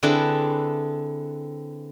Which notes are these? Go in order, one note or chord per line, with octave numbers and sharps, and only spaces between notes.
D3 C4 E4 G#4 A4 B4